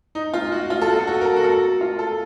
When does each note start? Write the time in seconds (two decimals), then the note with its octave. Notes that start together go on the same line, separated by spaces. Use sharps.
0.15 D#4
0.33 F4
0.52 F#4
0.70 F4
0.81 A4
0.88 F#4
0.99 A4
1.07 F#4
1.21 A#4
1.25 A4
1.36 F#4
1.44 A4
1.81 F4
1.99 A4